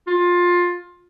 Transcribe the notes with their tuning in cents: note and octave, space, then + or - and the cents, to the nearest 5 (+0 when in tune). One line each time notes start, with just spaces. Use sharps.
F4 +15